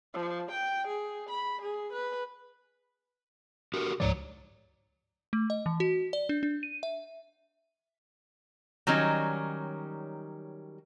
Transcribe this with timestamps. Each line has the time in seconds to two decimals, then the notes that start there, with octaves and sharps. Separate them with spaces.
0.14 F3
0.52 G5
0.88 G#4
1.30 B5
1.62 G#4
1.93 B4
3.74 F#4 G4 A#4
4.00 C#2 G#2 F3 C#5 D5 A#5
5.33 A3
5.50 D#5
5.66 E3
5.80 F#4
6.13 D5
6.29 D4
6.43 D4
6.63 D#7
6.83 E5
8.87 D#3 F#3 G3 C#4 D#4